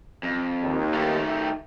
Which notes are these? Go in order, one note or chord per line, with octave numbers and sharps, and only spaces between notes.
F2
D#2
D#3 A3
E5 G5